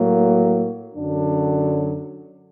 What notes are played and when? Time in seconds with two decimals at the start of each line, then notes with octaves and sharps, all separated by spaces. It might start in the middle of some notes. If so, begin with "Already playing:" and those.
Already playing: A2 F#3 A#3
0.95 F#2 D3 F#3 D4